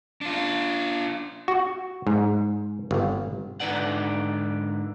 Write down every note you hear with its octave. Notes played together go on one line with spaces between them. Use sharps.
D4 F4
F#4
G#2
G1
G#2 D3 D#4 B4 D5 F#5